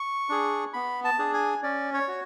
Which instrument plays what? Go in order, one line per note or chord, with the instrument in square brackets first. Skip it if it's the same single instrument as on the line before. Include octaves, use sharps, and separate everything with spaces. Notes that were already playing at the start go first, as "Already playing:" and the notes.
Already playing: [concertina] C#6
D4 G#4
B3 B5
A5
D4 G#4
G#5
C#4 D5
C#5
F#4